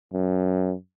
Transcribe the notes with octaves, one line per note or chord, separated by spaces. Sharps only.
F#2